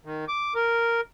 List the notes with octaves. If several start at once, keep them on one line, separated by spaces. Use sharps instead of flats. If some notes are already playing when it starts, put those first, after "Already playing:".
D#3
D6
A#4